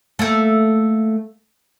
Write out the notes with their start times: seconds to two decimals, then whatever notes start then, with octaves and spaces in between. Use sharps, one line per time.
0.19 A3 A#3